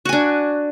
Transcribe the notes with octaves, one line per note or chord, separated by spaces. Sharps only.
D4 F#4 G#5